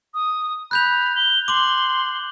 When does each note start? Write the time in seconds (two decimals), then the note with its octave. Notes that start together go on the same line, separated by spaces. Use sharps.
0.14 D#6
0.71 B5 F#6 G6 F7
1.16 G7
1.48 C6 D6 F#7 G7